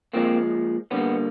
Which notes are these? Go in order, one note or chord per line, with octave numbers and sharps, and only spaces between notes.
A#2 F3 G#3 A#3 C4
D3 G3 A#3 B3 C#4